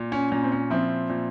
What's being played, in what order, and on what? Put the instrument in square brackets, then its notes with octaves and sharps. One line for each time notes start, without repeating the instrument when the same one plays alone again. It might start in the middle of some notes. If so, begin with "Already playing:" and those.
Already playing: [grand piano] A#2
C#4
A#2 C#4
C4
C#4
F3 C4 E4
A#2